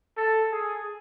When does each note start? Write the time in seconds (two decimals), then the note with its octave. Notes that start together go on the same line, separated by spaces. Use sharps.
0.17 A4
0.52 G#4